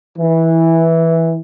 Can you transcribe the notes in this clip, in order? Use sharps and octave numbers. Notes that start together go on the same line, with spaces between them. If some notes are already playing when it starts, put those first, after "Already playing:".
E3